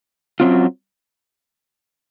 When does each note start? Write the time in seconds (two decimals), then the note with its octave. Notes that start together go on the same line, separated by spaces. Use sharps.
0.40 F#2 D#3 F#3 C4 F4